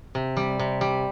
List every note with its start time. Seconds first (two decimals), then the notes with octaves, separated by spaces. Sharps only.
0.15 C3
0.37 G3
0.59 C3
0.81 G3